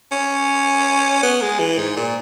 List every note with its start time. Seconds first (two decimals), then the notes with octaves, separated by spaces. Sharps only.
0.12 C#4
1.23 B3
1.41 G#3
1.59 E3
1.78 G#2
1.97 A#2